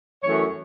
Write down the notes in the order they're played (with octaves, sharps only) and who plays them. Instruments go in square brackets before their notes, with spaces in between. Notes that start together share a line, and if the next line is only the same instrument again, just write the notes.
[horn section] F#2 E3 A3 C#5